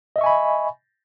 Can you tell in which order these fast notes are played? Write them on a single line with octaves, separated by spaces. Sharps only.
D#5 E5 C#6 G#5 B5